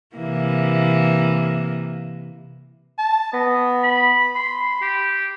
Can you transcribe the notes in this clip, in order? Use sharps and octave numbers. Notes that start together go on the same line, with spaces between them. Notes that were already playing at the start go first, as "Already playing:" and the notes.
C3 E3 A#3
A5
B3 D#5
B5
B5 C6
G4